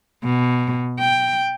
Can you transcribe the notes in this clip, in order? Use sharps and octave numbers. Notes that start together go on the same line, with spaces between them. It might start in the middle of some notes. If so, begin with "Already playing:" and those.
B2
G5